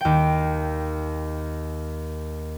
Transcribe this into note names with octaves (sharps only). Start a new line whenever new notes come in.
D#2 G5